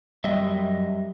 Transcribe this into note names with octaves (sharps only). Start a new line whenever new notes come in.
F#2 G3 D#5 E5